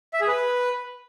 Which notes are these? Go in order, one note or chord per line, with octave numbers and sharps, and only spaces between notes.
E5
G#4
B4